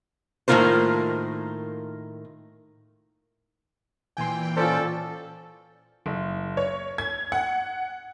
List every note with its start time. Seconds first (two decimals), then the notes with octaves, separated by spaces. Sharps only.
0.48 A2 D#3 A#3 F4 A#4 C5
4.17 A#2 E3 G5 G#5 C6
4.57 C#4 F4 A4 C5 D5
6.06 F#1
6.57 C#5
6.98 G#6
7.32 F#5